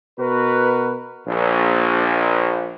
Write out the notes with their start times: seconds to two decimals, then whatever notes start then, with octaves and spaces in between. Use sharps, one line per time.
0.19 B2 F#4 A#4 B4
1.27 A#1